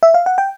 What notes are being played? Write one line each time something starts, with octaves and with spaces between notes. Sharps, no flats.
E5
F5
F#5
G5